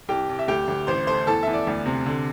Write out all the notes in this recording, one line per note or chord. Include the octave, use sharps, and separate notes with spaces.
C2 G4 G5
C2
E5
D2 G4 G5
D2
A1 C5 C6
A3 C5 C6
E2 A4 A5
E2 E5
D5
D2
C3
D3